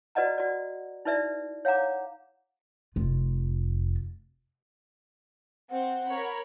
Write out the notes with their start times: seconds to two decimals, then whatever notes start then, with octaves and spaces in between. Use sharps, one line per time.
0.15 F#4 B4 D5 D#5 F#5 A#5
0.38 F#4 D5
1.05 D#4 E4 B4 D5 E5
1.65 C#5 F5 F#5 A#5 D6
2.96 F1 F4
5.70 C4 F#5
6.09 A#4 C#5 B5